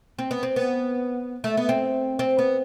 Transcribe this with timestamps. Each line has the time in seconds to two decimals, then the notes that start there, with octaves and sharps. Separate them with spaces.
0.19 C4
0.31 B3
0.43 C4
0.56 B3
1.44 A3
1.57 B3
1.69 C4
2.19 C4
2.39 B3